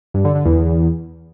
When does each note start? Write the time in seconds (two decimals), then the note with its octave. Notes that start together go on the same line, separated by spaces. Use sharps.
0.14 G2
0.25 D3
0.35 D3
0.45 E2